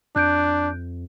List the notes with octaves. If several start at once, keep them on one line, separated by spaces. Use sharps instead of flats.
F2 D4 F#6 G6 D7